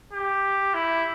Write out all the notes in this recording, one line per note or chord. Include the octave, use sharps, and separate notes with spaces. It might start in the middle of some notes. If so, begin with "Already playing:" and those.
G4
E4